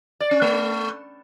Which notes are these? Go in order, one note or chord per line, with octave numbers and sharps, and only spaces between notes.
D5
C#4
A3